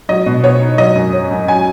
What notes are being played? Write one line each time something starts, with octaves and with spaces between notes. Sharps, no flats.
F#3 D#5
B2
B3 C#5
D#4
F#3 D#5
F#2
C#4
F#2
F#3 G#5